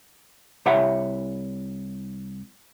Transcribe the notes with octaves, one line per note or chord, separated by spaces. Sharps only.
C2 E4 G4 C#5 E5 F#5